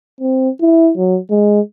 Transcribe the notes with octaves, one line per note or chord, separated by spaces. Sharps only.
C4
E4
F#3
G#3